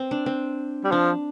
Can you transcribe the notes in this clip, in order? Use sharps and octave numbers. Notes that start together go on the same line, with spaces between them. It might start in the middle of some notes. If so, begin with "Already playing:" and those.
Already playing: C4
D4
C4
G3
F3 D4